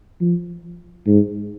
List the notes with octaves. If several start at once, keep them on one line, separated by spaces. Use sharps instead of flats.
F3
G#2